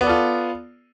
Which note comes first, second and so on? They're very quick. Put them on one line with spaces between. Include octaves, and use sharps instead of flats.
B3 D5 A4 F4